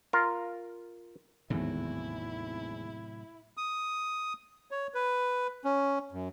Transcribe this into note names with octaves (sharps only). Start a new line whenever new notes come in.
F4 A#4
G#1 E2 A2 C3 F#3 E4
D#6
C#5
B4
C#4
F#2